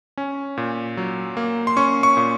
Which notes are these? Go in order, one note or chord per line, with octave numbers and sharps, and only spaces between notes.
C#4
A#2
F#3
A#3
C6
C#4 C#6
C#6
A#2